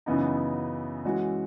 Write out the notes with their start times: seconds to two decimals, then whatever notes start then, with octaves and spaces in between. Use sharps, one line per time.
0.06 F#2 C#3 E3 B3 D#4
1.05 E3 G#3 C#4 F#4